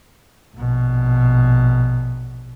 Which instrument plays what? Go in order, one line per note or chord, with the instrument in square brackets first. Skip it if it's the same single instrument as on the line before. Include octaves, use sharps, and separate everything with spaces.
[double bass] A#1 B2